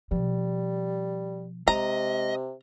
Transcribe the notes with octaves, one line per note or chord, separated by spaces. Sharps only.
B2 F3 G3
C3 G#3 D#5 A#5